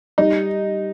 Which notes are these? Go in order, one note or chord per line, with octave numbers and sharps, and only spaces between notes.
G3 D#4